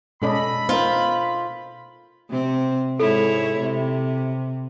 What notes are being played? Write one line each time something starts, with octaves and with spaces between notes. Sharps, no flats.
B2 G#3 C#4 A4 D5 D#5 B5
B3 D#4 F4 A#4 C5
C3 C4
G#2 E4 A4 C#5
C3